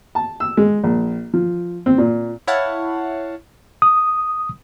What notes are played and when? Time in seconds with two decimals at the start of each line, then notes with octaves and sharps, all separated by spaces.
0.15 A5
0.40 E6
0.57 G#3
0.84 A#1
1.34 F3
1.86 C4
1.98 A#2
2.47 E4 C#5 F5 F#5 A5
3.82 D#6